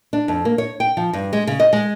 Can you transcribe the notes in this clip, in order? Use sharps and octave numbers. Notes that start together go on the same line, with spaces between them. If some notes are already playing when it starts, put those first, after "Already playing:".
D4
F2
A#3
C#5
G5
F3
G2
G#3
C#3
D#5
G#3